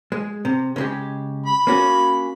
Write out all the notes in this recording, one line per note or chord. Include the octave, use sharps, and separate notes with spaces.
G#3
C3
C#3 G#3 G4
B5
A#3 C#4 F#4